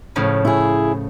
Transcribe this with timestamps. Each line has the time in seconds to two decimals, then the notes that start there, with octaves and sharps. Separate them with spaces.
0.16 A2 C#3 F3
0.45 E4 G#4